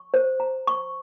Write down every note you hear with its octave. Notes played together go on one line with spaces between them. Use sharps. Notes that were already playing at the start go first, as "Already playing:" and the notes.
Already playing: C#6
C5
A#5
C#6